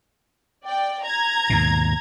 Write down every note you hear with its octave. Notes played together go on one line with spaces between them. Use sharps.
D5 G5
A#5 G#6
D#2 G#2 B2